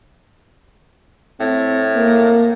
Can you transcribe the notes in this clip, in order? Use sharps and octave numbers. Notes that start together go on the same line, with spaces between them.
A2 C4
A#3